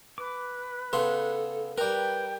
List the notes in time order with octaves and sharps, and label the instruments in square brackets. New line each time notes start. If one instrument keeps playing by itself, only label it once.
[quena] B4 [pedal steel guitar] D6
[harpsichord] C#3 B3 C6 [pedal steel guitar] A4
[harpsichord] G3 A#4 [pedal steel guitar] B4 A#5 [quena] G5